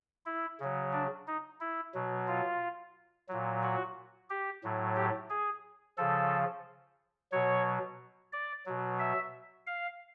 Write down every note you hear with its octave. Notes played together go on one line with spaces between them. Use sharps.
E4
C#3 F#3
D4
D#4
E4
B2 F#3
F4
A#2 F#3
F#4
G4
A2 F#3
G4
G#4
C#3 F3 A4
B2 F#3 C#5
D5
B2 F#3
E5
F5